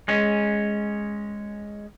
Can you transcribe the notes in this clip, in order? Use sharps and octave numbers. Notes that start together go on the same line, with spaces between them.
G#3 C#4